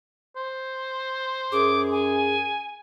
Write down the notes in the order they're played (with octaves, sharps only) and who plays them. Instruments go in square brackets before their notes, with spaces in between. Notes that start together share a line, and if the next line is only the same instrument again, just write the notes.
[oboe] C5
[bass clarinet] F#2 [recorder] G#4 [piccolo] D6
[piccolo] G#5